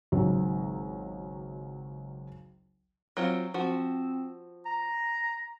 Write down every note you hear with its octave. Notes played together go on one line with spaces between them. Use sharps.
G#1 C#2 F#3
F#3 C4 F4
F3 C4 F#4
A#5